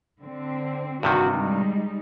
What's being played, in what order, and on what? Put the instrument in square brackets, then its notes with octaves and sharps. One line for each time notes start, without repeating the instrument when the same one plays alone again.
[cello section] D3 C4
[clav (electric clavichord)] G2 C3 D#3 [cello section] F#4
[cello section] G3 G#3 D#4